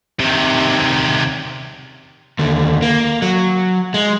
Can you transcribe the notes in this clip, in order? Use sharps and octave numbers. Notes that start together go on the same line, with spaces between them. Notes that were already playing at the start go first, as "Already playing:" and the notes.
C3 D#3
D#2 D3
A#3
F#3
G#3